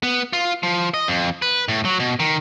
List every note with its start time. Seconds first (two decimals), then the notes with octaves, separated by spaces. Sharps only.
0.03 B3
0.33 F4
0.63 F3
0.94 D#5
1.08 F2
1.42 B4
1.68 A2
1.85 F#3
1.99 B2
2.20 D#3